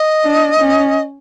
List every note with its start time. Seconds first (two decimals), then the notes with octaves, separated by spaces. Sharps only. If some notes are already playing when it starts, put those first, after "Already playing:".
Already playing: D#5
0.24 D4
0.60 C#4